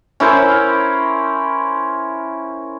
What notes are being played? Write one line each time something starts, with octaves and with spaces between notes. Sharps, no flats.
C#4 E4 A#4 C5